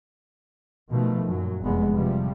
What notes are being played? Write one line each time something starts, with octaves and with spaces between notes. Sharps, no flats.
B2 D#3 F3 A3
F#2 A#2 F#3
F1 E2 B2 G#3 B3
C3 F3 G3